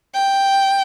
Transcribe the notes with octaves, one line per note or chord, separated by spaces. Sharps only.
G5